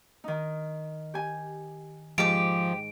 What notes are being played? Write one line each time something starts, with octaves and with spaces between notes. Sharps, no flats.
D#3 D#4
G4 G#5
G#2 F3 G4 D6 D7